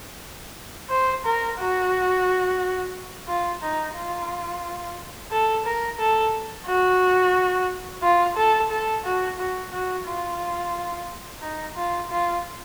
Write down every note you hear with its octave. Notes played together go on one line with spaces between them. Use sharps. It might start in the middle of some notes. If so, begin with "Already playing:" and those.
C5
A#4
F#4
F4
D#4
F4
A4
A#4
A4
F#4
F4
A4
A4
F#4
F#4
F#4
F4
D#4
F4
F4